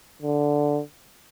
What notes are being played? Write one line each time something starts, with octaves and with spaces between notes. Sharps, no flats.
D3